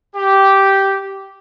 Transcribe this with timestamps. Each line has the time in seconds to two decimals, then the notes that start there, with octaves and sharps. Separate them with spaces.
0.15 G4